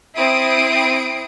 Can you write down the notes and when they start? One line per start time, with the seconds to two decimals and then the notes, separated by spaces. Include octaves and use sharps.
0.17 C4 E4 D#6 C7 D7